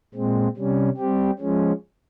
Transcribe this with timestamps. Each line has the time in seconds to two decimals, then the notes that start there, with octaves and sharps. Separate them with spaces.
0.14 A#2 G#3 C4
0.57 C3 G3 C#4
0.98 G3 C4 G4
1.39 F3 G#3 C#4